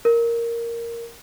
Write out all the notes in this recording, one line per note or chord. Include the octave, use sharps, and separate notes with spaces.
A#4